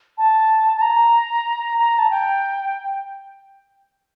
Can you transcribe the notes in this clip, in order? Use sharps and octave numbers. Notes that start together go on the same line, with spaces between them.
A5
A5
A#5
A#5
A5
G5